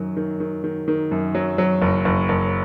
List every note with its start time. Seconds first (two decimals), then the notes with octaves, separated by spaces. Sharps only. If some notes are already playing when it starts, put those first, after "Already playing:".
Already playing: F#2 D#3 F#3
0.17 D#3
0.40 D#3
0.64 D#3
0.88 D#3
1.11 F#2
1.35 F#3
1.58 F#3
1.82 F#1
2.05 F#1
2.29 F#1